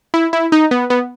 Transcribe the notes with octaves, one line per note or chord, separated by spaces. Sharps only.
E4
E4
D#4
B3
B3